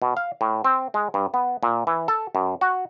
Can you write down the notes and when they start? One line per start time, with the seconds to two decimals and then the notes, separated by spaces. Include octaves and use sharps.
0.02 B2
0.17 F5
0.41 A2
0.64 C4
0.94 G#3
1.14 G2
1.34 B3
1.63 A#2
1.87 E3
2.08 A4
2.35 F#2
2.61 F#4